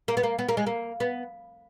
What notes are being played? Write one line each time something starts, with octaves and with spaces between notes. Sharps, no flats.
A#3
B3
A#3
B3
A#3
G#3
A#3
B3